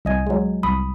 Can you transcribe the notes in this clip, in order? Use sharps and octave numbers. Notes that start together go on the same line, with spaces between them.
C2 D#5 G#5
F#3 G#3
C2 B5 D#6